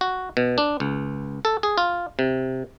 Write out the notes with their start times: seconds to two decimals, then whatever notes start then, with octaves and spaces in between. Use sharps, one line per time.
0.01 F#4
0.37 B2
0.58 D4
0.80 C#2
1.45 A4
1.63 G#4
1.78 F4
2.19 C3